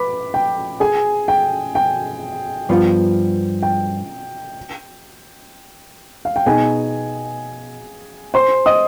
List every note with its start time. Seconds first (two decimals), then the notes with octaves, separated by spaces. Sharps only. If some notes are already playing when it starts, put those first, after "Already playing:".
Already playing: B4 B5 D6
0.34 G5
0.80 G#4 G#5
1.28 G5
1.75 G5
2.69 G2 F3 B3 F4
3.63 G5
6.25 F5
6.36 G5
6.46 B2 B3 D#4 G#4 G#5
8.34 C5 C6
8.66 D#5 D#6